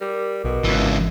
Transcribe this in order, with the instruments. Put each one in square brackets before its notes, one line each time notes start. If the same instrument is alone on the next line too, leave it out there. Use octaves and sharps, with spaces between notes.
[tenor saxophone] G3 [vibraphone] A#4 D6
[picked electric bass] B1 [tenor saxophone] B2
[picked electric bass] G#1 [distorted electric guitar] C#2 E3